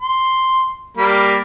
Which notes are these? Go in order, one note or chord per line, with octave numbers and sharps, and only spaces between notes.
C6
G3 A#3 B5